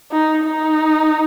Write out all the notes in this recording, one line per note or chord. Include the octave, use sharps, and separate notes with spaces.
D#4
D#4